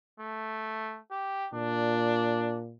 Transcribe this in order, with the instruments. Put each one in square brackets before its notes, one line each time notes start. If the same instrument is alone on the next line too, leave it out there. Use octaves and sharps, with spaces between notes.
[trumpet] A3
G4
[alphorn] A#2 [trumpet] D4